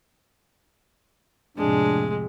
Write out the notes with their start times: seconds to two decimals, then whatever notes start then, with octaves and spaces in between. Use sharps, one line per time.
1.57 F2 A2 C3 G#3 D4